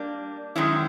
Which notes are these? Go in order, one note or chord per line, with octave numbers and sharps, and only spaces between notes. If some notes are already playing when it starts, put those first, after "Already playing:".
Already playing: G3 A#3 D4
F#2 D#3 G#3 C#4 E4